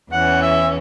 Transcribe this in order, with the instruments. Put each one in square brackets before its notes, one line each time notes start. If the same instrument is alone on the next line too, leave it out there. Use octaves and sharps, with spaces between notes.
[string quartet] E2 E3 C#4 [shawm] F#5
[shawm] E5